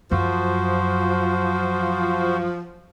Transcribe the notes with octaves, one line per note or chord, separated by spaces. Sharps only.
F#2 F3 F#4 C5